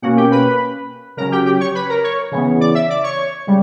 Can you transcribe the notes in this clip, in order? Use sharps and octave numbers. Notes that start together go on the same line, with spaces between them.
B2 A#3 C#4 F#4 F#5
G4 G5
B4 B5
C#3 F#3 C#4 A#4 A#5
G4 G5
G4 G5
C#5 C#6
B4 B5
A#4 A#5
C#5 C#6
C#3 E3 B3
D5 D6
E5 E6
D5 D6
C#5 C#6
C#3 G3